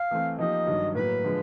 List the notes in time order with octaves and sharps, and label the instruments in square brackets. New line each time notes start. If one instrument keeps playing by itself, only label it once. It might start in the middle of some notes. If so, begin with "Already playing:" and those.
Already playing: [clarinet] F5
[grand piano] E3 A3 C4
[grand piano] F3 A#3 D#4 G4 [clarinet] D#5
[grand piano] G2 D#3 F#3
[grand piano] A2 F#3 A#3 [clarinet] B4
[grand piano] D3 F3 G#3